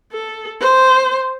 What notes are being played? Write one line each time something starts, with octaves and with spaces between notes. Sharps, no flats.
A4
C5